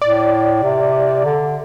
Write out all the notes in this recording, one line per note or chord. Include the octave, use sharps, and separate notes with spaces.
A2 D5
C3
D3